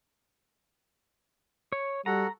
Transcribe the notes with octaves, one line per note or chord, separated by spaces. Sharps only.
C#5
G3 F#4 A4 F#5 A#5